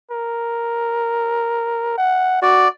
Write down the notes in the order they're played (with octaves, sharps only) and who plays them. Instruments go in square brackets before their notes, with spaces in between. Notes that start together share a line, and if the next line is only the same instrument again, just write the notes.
[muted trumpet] A#4
F#5
[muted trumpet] F#4 [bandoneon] D5